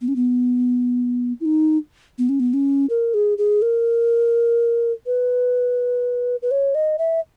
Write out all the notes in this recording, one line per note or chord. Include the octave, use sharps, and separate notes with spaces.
B3
C#4
B3
E4
D#4
B3
C#4
B3
C#4
A#4
G#4
G#4
A#4
B4
B4
C#5
D#5
E5